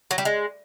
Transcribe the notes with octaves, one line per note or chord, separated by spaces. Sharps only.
F#3
G3
G#3